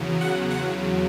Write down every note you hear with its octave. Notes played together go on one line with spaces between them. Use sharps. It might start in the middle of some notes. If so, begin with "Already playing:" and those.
Already playing: E2 C#3 F#3
F#5
F#5